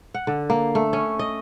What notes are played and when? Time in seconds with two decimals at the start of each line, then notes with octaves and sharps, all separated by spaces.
0.14 F#5
0.27 D3
0.50 A#3
0.75 A3
0.93 C#4
1.19 D#5